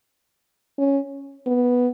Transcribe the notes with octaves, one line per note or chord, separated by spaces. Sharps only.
C#4
B3